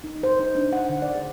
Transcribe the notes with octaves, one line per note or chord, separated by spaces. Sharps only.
D#4
C5
D#4
D4
F#5
D3
D5
G#4